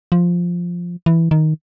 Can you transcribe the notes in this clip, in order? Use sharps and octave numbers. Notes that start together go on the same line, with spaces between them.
F3
E3
D#3